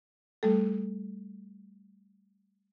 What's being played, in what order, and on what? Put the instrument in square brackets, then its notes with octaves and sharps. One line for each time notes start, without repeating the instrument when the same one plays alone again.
[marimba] G3 A3 A4